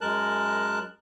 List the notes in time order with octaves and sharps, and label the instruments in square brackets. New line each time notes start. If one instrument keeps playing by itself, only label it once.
[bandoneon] F#2 G#3 A#4 A5 F#6